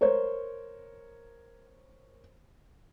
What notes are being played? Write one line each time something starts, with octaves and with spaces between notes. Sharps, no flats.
A#4 C5 C#5